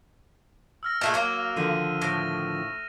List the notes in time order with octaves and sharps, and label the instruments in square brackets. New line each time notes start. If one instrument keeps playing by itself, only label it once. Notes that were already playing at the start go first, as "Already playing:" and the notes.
[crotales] E6 F6 A#6
[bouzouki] A#2 A3 G#4 [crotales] F#6 F7
[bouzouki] F#3 A#3
[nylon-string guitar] D3 D#3 F3 [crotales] D#7
[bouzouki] A2 [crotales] D#6 A#6